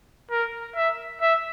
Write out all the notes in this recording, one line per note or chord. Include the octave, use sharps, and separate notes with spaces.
A#4
E5
E5